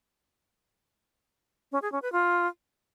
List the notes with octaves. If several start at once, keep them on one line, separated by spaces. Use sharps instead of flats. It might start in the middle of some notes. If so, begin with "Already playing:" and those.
C#4
G#4
C#4
B4
F4